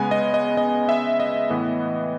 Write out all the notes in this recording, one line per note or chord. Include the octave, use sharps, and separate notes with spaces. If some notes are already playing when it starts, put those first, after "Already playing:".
Already playing: C#3 G#3 B3 G#5
D#5
D#5
D#5
E5
D#5
A2 E3 B3